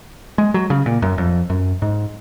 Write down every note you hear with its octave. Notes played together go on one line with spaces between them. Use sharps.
G#3
F#3
C#3
A#2
F#2
F2
F#2
G#2